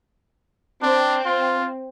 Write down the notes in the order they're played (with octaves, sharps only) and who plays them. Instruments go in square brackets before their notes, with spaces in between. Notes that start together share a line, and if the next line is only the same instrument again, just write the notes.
[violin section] C4 [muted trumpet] D4
[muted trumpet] F4